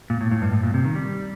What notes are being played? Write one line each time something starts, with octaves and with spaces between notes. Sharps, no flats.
A#2
A2
A2
G2
A2
A#2
C3
D#3
G3